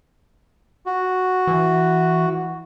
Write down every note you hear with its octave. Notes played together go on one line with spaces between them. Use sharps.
F#4
E3